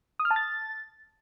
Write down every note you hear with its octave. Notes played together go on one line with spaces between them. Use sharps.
D#6
F6
A5
A6